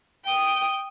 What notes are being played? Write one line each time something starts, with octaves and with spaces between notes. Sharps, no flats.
G5 D#6